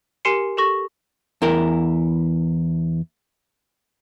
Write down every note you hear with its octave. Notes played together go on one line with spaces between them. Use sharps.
G4 A#4 G#5 C6 C7 C#7
G4 A4 C#6 A#6
E2 E4 A#4